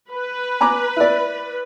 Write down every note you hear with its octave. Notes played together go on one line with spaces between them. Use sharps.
B4
G#5 A#5 D6
E4 D5